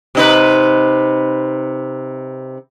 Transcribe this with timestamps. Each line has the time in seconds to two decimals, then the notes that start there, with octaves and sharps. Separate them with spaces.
0.15 C3 D#4 B4